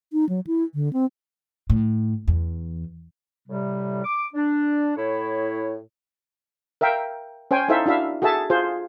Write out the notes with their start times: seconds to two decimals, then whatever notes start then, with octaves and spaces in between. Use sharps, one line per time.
0.13 D#4
0.29 F#3
0.47 E4
0.74 D3
0.93 C4
1.70 A2
2.28 E2
3.49 A2 C3 G3
4.05 D6
4.34 D4
4.97 A2 E4 C#5
6.81 A#4 E5 F5 G5
7.51 C#4 C5 G5 G#5
7.68 D#4 E4 A4 C5 E5 F5
7.86 D4 E4 F#4 E5 F5
8.22 F#4 G#4 A4 E5 A5
8.50 F4 G#4 C5